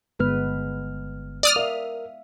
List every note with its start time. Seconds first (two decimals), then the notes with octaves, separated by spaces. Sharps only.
0.19 G1 G#3 B3 B4 F6
1.43 D5 D#6 F6
1.56 A#4 E5 F5